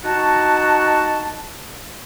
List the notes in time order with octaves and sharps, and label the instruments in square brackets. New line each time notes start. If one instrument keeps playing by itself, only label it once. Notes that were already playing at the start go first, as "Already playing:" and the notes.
[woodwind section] D#4 F#4 A5